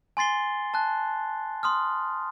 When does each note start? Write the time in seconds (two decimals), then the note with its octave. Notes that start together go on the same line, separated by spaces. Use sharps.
0.17 G#5 C6 A6 C7 G7
0.74 A5 F#6
1.63 C6 D#6 F6